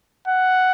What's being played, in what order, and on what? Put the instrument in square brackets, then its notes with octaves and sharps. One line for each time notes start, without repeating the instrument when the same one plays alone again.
[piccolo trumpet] F#5